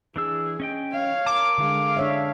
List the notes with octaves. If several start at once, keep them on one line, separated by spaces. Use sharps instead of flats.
E3 D4 G#4 E6
C#4 D#5 G5
C#5 F5
A#4 A5 D6
D3 G#3 F5
D4 C#5 E5